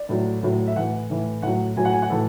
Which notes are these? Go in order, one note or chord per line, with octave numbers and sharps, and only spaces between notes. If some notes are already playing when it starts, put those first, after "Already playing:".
Already playing: D5
A2 F#3
A2 F#3
E5
A2 E3 F#5
A2 E3
A2 F#3 F#5
A2 F#3 G#5
F#5
G#5
F#5
A2 E3 A4